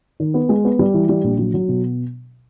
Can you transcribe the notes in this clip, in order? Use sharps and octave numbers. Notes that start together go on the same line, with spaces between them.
D#3
B3
G#3
B3
G3
E3
G3
A#1
F#3
F#3
B2